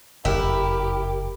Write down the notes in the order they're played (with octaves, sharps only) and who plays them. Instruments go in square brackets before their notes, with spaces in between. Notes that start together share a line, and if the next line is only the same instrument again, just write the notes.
[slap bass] F#1 F2 [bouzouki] E4 [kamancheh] G4 [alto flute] A#4